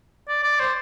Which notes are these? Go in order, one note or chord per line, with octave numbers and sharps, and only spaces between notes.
D5
D5
C5